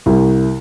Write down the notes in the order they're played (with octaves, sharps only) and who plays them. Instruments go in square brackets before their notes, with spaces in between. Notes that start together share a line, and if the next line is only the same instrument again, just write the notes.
[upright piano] C2